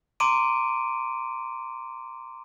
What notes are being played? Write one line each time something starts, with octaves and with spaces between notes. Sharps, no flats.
A#5 C6 D6 D7 D#7